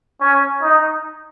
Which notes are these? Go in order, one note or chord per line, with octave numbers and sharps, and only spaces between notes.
C#4
D#4